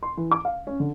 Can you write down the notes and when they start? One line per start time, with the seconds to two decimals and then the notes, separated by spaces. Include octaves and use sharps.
0.03 C6
0.17 E3
0.31 D6
0.45 F5
0.67 C#4
0.80 D3